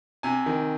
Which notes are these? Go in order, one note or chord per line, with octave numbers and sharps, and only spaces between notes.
C3 G#5
D#3